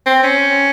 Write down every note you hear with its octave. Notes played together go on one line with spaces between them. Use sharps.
C4
C#4